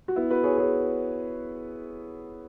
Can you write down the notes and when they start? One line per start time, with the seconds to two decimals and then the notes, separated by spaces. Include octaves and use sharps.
0.08 F#4
0.16 B3 E4
0.30 F#4 B4
0.44 G#4 C#5
0.58 G#4 C#5